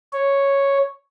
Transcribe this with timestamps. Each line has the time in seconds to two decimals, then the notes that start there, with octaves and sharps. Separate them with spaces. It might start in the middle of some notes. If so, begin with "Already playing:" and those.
0.13 C#5